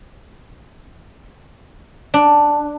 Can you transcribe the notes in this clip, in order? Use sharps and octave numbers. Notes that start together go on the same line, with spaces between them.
D4